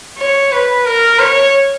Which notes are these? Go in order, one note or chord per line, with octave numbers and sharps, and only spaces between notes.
C#5
B4
A#4
C#5